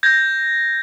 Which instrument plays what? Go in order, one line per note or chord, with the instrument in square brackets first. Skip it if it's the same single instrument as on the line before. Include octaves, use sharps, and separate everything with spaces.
[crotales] G6 G#6 A#6